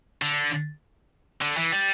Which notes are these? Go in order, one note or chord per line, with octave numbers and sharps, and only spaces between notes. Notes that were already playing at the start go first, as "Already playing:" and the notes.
D3
D3
E3
G3